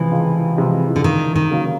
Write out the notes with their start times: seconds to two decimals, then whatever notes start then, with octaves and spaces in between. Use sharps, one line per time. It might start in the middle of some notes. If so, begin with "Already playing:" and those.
Already playing: C#2 C3 E3 F3 G#3
0.11 C#2
0.58 C3 F3 G#3
0.96 D3
1.04 C#2 D#3
1.36 D#3
1.51 C#3 F#3 A#3 C#4